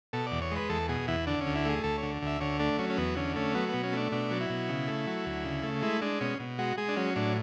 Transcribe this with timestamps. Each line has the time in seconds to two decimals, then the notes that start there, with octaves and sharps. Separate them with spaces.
0.13 B2 A4
0.27 E2 D5
0.42 C#5
0.51 G#3 B4
0.69 E2 A4
0.89 B2 G#4
1.08 E2 E4
1.27 D3 D4
1.41 C#4
1.47 D2
1.55 E4
1.65 A3 G#4
1.84 D2 A4
1.98 D3 C#5
2.22 D2 E5
2.41 D3 C#5
2.60 A3 D4
2.78 F#3 C#4
2.90 C#4
2.98 E2 B3
3.17 D3 C#4
3.36 A3 C#4
3.55 F#3 B3
3.69 B2 B3
3.84 C#4
3.93 A3 D4
4.12 B2 D4
4.31 F#3
4.41 E4
4.50 B2
4.69 C#3
4.88 A3
5.07 F#3
5.26 D2
5.45 C#3
5.63 A3
5.83 G#3 E4
6.02 G#3 D4
6.21 B2 C#4
6.40 B2
6.59 G#3 F#4
6.77 G#3 G#4
6.89 D4
6.97 F#3 C#4
7.16 A2 D4